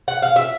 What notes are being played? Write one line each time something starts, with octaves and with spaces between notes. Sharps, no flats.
F#5
F5
E5